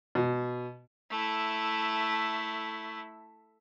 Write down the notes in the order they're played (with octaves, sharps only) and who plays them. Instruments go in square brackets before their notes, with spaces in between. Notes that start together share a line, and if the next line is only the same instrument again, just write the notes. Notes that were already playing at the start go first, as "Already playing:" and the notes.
[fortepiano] B2
[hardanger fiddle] A3 E4